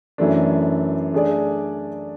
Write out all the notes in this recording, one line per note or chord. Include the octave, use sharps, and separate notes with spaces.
F#2 E3 A3 D4
A3 D4 G#4 D5